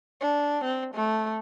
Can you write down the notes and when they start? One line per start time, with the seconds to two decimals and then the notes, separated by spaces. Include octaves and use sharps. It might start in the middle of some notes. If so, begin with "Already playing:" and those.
0.21 D4
0.64 C4
0.94 A3